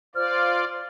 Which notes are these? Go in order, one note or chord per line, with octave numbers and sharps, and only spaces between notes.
F4 C5 D5 F6